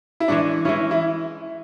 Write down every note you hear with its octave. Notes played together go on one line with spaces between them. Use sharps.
E4
E3 G#3 C#4 D4
E3 G#3 C#4 E4
E4